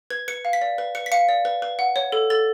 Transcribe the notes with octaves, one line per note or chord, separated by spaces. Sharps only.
B4 G#6
B4 C#7
F5
B6
D5
B4
B4 C#7
B6
F5 C#7
D5
B4
B4
F#5
C#5
A4
A4 A6